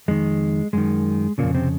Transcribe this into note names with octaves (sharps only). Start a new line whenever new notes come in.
F2 D#3 G#3
F#2 D#3 G#3
F2 A#2 C#3 A#3
C3 C4